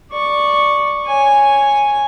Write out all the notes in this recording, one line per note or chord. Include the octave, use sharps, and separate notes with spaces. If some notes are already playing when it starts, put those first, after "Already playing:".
D5 C#6
C#5 G#5